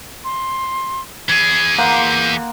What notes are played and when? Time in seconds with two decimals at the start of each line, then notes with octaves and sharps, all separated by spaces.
0.24 C6
1.29 E3 G#4 G#6
1.78 A#3 F#5 C6 G6